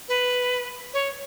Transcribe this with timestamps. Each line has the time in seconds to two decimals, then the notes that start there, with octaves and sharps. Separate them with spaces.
0.09 B4
0.94 C#5